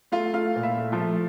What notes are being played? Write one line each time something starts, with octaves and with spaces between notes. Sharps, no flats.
A3 F4 F5
A3 F4 F5
A#2
E4 E5
A3
F3 F4
A3